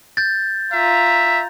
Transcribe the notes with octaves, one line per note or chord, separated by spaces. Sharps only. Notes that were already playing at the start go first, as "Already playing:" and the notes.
G6 A6
F4 E5 A#5